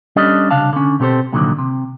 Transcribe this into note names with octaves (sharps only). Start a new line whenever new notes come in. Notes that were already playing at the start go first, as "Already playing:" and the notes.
G3 C#4 D4 G4 A4 D#5
C2 C#3 D4 F5 A5
D3 C#4
B2 C4 G4 A4 C5
C2 A#2 D3 D#3 F#3
C3